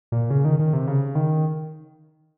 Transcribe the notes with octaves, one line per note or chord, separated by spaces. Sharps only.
A#2
C#3
D#3
D#3
C3
C#3
D#3